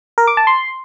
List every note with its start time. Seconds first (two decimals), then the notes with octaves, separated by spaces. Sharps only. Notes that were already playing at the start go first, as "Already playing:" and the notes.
0.18 A#4
0.27 D6
0.37 A5
0.47 C6